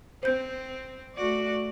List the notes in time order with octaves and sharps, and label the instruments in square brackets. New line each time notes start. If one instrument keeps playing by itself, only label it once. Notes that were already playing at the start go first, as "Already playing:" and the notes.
[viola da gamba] C4 [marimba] C5 G6
[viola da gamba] A3 F#4 D5